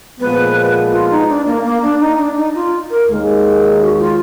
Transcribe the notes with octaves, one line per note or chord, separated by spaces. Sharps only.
A#2 F3 G#3 B3 B4
F4
D#4
D4
A#3
A#3
D4
D#4
D4
D#4
F4
A#4
D#2 D#3 G#3
F#4
F4